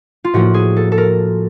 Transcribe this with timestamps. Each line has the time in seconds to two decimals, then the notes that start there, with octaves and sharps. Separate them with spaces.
0.24 F4
0.34 A2 F3 A#3 F#4
0.54 G#4
0.77 A4
0.92 A4
0.98 A#4